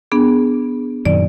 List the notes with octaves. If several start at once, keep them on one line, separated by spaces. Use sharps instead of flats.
B3 D4 G#4
F#2 A#2 D#3 D5